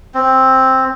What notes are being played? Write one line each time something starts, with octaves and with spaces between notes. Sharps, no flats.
C4